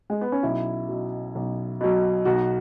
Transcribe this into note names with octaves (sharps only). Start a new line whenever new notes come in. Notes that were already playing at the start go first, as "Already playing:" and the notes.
G#3
B3
C#4
B1 E4
B2 F#3
B1
B2 F#3
B1 F#4